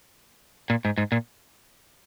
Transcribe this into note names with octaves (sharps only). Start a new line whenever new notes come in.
A#2
G#2
G#2
A#2